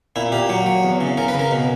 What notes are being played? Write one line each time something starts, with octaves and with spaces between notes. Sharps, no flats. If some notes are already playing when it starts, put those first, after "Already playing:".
A#2 E4
A#2 G4
F#3
F#3
E2
C#3
C#3 A#4
B4
C#3
A#4
B2